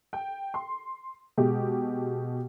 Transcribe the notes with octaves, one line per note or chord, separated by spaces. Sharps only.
G5
C6
B2 G#3 G4